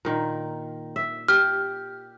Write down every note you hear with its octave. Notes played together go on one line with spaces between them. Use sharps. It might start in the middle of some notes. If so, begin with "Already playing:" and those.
A#2 D#3
E5
G4 F6